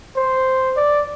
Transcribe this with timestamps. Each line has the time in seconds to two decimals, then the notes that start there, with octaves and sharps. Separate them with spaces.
0.16 C5
0.77 D5